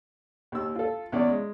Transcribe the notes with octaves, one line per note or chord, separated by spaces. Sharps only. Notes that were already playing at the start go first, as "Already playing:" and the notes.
D#2 E6
F4 A4
E2 C#4 D5
G#3